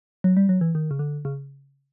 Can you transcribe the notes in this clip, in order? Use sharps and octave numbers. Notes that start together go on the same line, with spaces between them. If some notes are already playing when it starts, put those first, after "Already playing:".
F#3
G3
F#3
E3
D#3
C#3
D3
C#3